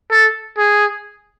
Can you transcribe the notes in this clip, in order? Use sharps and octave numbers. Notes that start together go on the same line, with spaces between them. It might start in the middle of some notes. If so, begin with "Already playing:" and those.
A4
G#4